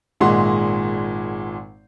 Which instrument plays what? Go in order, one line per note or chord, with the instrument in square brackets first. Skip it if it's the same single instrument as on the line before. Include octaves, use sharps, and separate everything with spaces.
[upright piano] G#1 A#2 G#3 F#5 C6